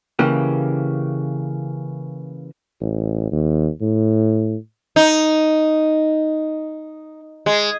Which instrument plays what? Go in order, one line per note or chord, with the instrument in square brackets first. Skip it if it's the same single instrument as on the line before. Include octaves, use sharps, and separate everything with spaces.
[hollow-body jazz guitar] C#3 E3 A#3 G4
[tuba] A1
D#2
A2
[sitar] D#4
G#3